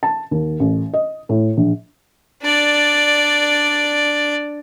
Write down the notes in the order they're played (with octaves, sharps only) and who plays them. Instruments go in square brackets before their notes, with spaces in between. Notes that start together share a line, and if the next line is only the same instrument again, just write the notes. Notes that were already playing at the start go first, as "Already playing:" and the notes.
[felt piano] A5
D#2
A1
D#5
A2
A#1
[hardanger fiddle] D4 D5